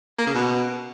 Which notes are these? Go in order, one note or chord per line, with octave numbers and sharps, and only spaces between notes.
A#3
C#3
B2